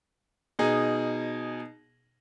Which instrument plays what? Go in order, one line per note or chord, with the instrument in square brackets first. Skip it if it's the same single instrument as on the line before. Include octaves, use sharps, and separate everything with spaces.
[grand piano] B2 D#4 G#4 D#5